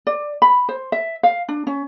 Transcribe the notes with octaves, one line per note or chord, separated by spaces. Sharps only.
D5
B5
C5
E5
F5
D4
C#4